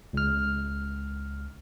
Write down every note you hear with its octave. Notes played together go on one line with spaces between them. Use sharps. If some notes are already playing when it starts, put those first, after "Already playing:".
C#2 F6